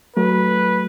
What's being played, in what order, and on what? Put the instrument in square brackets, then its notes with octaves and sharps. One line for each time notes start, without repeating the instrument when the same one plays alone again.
[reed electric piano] F#3 A3 [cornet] B4